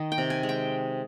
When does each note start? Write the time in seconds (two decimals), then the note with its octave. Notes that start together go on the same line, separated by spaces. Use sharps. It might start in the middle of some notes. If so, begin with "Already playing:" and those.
Already playing: D#3 D#5
0.12 G5
0.18 C3
0.30 G#5
0.43 G#3
0.49 G5